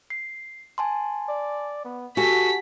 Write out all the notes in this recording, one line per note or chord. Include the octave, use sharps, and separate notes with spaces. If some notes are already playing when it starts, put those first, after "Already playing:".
C7
G#5 A5 C6
D5
B3
F#4 G4 A4 G#5 A5 B6